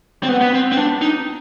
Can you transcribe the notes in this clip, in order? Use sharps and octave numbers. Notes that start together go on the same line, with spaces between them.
C4
B3
B3
C4
C4
D4
D#4